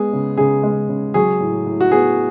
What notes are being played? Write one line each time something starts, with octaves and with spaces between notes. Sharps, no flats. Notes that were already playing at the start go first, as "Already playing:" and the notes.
Already playing: G#3 B3 G#4
C#3
C#3 G#4
G#3
C#3
F#3 G#4
A2
A2
F#4
B3 G#4